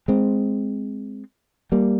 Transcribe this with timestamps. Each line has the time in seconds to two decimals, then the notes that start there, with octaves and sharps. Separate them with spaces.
0.08 G#3 C4
1.72 G3 A#3